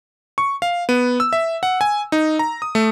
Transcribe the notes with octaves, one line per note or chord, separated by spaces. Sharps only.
C#6
F5
B3
E6
E5
F#5
G#5
D#4
A#5
D#6
A3